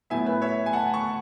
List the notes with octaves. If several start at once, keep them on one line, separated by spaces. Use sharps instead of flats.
A2 F#3 B3 E4 E5 G#5
B4
C#5 E5
G#5
F#5 A5
A5 C#6